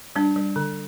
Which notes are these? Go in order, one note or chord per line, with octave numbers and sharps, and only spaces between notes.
G3 D4
G3
D3